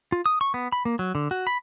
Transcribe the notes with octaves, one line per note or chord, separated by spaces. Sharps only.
F4
D#6
C#6
B3
B5
A#3
F#3
D3
F#4
B5